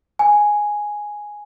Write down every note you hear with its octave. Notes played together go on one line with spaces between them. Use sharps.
G#5